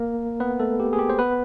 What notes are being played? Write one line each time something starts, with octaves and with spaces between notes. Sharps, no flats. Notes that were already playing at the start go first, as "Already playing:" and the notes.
Already playing: A#3 A#4
B3 B4
A3 A4
G4
G#4
G4
C5
B3 B4